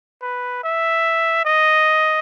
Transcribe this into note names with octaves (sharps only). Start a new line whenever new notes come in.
B4
E5
D#5